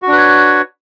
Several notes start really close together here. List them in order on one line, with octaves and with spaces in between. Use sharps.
F#4 D4 B4 C#5